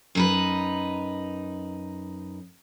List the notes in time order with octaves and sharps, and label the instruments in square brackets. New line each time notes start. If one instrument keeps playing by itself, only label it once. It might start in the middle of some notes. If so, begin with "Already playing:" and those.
[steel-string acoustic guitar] F#2 D#4 B4